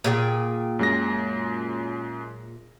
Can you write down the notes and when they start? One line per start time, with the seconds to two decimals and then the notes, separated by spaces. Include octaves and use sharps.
0.04 A#2 G#4 G5
0.79 F#2 G#3 A#6